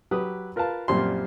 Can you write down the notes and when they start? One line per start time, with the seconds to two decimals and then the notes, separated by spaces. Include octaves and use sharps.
0.11 F#3 G4 B4 D#6
0.56 F4 A#4 B4 F5 A5
0.88 F#2 A#2 F3 G3 C4 C6